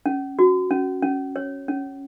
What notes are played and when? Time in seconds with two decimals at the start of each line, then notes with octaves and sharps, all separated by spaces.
0.06 C#4
0.39 F#4
0.71 C#4
1.02 C#4
1.36 C#5
1.68 C#4